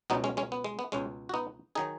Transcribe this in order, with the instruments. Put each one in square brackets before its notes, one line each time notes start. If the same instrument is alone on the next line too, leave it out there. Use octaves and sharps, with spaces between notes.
[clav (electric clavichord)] C#2 B2 F#3 B3 D#4
G#3 C#4
G#3 C#4
B3
G#3
B3
C#2 B2 G#3 C#4
F#4
B3 D#4
D#3 F#3 D#4 G#4